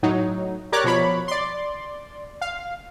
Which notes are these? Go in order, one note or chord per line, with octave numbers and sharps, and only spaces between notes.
A2 F#3 D#4
G4 A#4 C#5 D5 D6 F#6
B2 F3 C#5 B5
D5 C6
F5